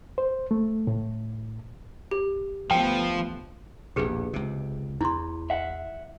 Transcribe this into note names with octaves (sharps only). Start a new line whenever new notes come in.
C5
A3
A2
G4
D2 F3 A3 B3 G5
A#1 E2 B2 G4 G#4 B4
C#2 C3
E2 E4 C6
E5 F#5